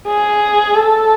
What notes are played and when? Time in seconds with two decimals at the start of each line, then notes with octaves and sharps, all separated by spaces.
0.08 G#4
0.76 A4